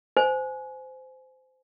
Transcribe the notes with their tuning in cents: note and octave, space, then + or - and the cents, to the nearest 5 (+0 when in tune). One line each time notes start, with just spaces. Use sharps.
C5 -20 G#5 +25